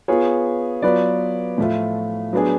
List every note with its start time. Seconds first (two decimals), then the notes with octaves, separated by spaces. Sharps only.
0.08 B3 F4 G#4 C#5
0.82 F#3 B3 F4 B4 D5
1.58 A2 F3 A3 F4
2.33 F#3 B3 D4 G#4